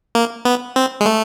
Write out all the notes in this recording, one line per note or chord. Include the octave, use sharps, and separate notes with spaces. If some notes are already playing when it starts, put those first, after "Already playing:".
A#3
B3
C4
G#3
A3